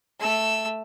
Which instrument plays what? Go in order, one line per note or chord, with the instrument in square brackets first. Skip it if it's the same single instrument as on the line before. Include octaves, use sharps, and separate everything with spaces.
[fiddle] A3 E6